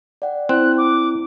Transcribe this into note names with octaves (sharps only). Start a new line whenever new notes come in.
D5 F#5 G5
C4 E4 C5 F#6
D6